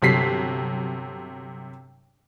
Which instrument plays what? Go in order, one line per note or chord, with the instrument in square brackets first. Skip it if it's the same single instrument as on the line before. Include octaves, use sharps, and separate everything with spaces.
[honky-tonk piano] G1 C3 F#3 B6 C7